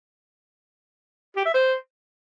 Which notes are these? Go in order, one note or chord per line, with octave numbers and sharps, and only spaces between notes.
G4
E5
C5